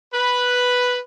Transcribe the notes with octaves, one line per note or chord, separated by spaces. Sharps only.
B4